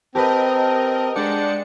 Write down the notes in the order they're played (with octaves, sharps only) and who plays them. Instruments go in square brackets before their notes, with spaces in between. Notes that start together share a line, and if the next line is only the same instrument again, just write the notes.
[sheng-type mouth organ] C4 [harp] G4 B4 [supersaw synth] A#4 D#5 [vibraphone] A5
[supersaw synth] G#3 D4 C#7 [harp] D5 [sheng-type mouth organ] F#5 G5 A5